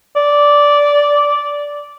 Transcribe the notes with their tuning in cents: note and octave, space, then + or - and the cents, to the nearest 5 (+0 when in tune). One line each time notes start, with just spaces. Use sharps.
D5 -10